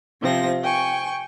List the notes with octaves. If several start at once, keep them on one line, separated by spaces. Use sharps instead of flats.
C3 F3 C4 A#6
G5 G#5 C#6